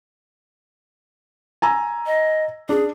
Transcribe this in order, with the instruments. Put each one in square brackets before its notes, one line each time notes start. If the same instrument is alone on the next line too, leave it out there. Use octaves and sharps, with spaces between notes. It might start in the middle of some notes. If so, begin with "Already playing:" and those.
[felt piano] G#5 A#5 E6
[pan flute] D#5
[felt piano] D4 [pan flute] G#4